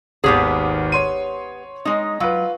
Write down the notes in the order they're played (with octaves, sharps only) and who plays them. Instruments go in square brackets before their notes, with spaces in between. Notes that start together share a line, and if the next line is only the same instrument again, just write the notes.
[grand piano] G#1 D#2 [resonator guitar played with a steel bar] B3 G4 G#4
[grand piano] C#5 C6 D#7
[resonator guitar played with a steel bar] G#3 D#4
[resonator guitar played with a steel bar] F#3 [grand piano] F4 B4